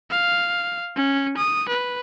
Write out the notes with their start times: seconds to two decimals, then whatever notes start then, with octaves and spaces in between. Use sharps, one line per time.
0.10 F5
0.96 C#4
1.37 D#6
1.69 B4